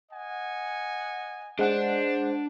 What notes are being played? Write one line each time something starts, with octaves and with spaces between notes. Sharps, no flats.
D#5 F#5 G#5
G#3 D4 C5 D5 F#5